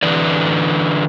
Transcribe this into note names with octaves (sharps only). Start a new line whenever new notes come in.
D3 E3 B4 D5